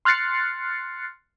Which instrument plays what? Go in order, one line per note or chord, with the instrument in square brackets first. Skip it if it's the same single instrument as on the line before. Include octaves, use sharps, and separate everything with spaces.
[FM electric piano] C6 F6 F#6 A6 C7 C#7